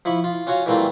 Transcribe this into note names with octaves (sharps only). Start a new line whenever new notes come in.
F3 E4 B5 C#6
F4
C#4 F4 F#4 C#5 F5
E3 G3 A3 A#3 C4 F4